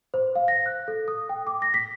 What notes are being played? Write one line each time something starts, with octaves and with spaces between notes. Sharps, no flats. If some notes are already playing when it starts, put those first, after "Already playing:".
C5
F5
A#6
F#6
A4
D#6
G5
D6
A#6
B6